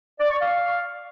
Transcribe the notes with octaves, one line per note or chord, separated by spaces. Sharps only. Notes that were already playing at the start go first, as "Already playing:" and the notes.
D5
C#6
F5